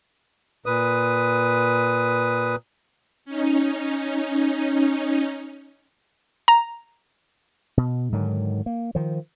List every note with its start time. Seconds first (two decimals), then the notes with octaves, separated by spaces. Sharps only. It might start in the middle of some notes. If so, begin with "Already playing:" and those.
0.66 A#2 B4 D#6
3.25 C#4 D#4
6.48 A#5
7.77 B2
8.12 G#2 D3 D#3 F#3
8.66 A#3
8.95 D#3 F3